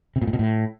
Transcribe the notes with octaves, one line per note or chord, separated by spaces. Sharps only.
C3
A#2
A2
B2
A2